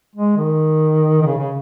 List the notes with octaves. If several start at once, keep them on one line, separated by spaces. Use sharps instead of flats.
G#3
D#3
D#3
C#3
C#3